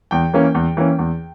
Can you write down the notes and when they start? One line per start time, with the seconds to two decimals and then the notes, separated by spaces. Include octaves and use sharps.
0.11 E2 G5
0.33 E3 A#3 C#4
0.55 E2
0.77 E3 A#3 C#4
0.99 E2